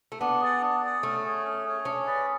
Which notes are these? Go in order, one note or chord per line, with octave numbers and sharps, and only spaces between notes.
A3
B3 D4
G#4 D5 F#5
D4
G#4 D5 F#5
A3 C#4
G#4 C#5
C#4
G#4 C#5
C#4 D4
G#4 B4 D5